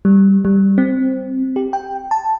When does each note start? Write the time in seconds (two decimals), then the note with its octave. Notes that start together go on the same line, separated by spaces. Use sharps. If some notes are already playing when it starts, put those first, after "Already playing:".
0.05 G3
0.45 G3
0.78 C4
1.56 G4
1.73 G5
2.11 A5